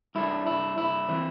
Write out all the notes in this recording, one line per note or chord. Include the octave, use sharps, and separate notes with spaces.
G2 G3 D4 E4
E4
E4
E3 C4